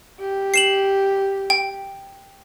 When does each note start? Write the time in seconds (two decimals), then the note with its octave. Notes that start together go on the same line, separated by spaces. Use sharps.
0.20 G4
0.54 C7 E7 F#7
1.50 G5